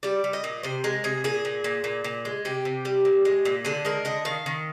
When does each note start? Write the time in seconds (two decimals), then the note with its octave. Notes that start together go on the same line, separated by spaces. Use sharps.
0.03 G3 D5
0.24 G3
0.33 D#5
0.44 A#2
0.63 C3 C5
0.84 G#3 A#4
1.04 C3 G#4
1.24 A#2 G#4
1.45 A#2
1.64 A#2
1.84 A#2
2.04 A#2
2.25 G#3
2.45 C3 G4
2.65 C3
2.85 G3
3.05 A#2
3.25 G#3
3.45 A#2
3.65 D3 G#4
3.85 G#3 A#4
4.05 D3 D#5
4.25 D#3 F5
4.46 D#3